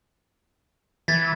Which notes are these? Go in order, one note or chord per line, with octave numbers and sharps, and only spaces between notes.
E3 G#6 A6 B6